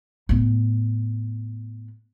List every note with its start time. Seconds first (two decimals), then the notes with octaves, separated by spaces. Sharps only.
0.29 A2 B3